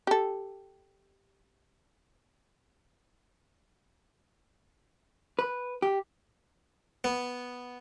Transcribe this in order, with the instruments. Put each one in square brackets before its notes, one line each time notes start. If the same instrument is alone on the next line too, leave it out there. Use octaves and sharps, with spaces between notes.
[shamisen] G4 A4
[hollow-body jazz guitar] B4
G4
[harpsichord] B3